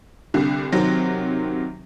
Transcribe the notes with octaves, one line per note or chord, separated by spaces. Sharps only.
C2 D3
C3 D#3 F#3 C4